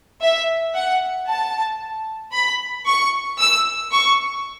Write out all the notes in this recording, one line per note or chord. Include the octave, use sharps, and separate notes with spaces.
E5
F#5
A5
B5
C#6
E6
C#6